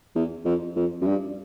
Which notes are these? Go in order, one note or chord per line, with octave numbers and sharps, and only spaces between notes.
E2
F2
F2
F#2
G2